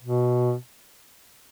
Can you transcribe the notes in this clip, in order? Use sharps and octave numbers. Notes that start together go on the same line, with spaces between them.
B2